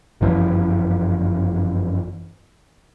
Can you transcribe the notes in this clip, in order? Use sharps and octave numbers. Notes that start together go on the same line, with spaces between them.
G1 F#2 E3 F3